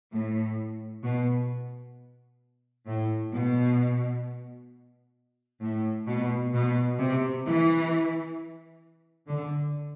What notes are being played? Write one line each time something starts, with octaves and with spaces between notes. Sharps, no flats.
A2
B2
A2
B2
A2
B2
B2
C3
E3
D3